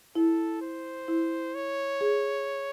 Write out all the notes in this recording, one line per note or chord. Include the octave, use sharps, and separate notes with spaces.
E4 A4
C5
E4
C#5
G#4